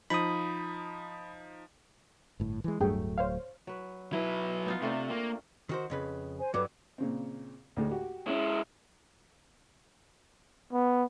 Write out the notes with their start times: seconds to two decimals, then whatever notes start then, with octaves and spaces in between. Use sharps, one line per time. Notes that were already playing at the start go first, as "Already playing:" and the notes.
0.10 F3 D#4 B5 D#6
2.40 G1 A2
2.64 E3 G#3
2.80 D1 G2 F#3 A3 G#4 G5
3.18 C5 C#5 F5
3.67 F#3 B4
4.13 F#3 E4 B4
4.66 B3 D#4 F4
4.82 C3 A3 C4 D4
5.10 A#3
5.69 D#3 F#4 C5
5.90 F2 C#3 B4
6.39 C5 G#5
6.54 G2 F#3 A4 B4 D6
6.98 A#2 C#3 C4
7.77 D2 A2 G#3
7.91 F#4 G4
8.27 G#3 C#4 E4
10.73 B3